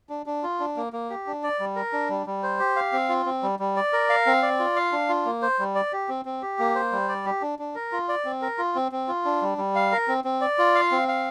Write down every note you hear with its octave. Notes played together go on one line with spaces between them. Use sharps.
D4
D4
F4
D4
A#3
A#3
G4
D4
D5
G3
A#4
D4
G3
G3
C5
G4
F5
C4
F4
C4
G3
G3
D5
A#4
F5
C4
D5
F4
F5
D4
F4
A#3
C5
G3
D5
G4
C4
C4
G4
A#3
C5
G3
D5
G4
D4
D4
A#4
F4
D5
C4
A#4
F4
C4
C4
F4
D4
G3
G3
F5
A#4
C4
C4
D5
F4
F5
C4
F5